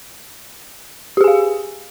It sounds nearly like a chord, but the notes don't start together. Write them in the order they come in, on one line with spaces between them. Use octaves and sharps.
G4 G#4 G#5 F5